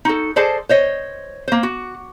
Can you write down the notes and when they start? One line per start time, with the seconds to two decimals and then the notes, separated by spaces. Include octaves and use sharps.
0.05 D#4 F#4 A4
0.36 G#4 A4 C5 D5 D#5 A5
0.69 C5 C#5 D#5
1.48 A#3 C5
1.63 F#4